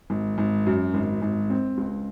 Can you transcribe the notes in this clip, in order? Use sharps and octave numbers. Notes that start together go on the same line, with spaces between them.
G#1
G#1
F#2
G#1
G#1
C4
C#2